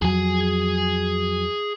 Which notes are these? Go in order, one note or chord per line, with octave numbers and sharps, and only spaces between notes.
F2 F#3 G#4 G#5